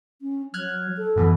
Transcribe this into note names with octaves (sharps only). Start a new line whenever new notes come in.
C#4
F#3 F6 F#6 G#6
A4
F#2 B2 E3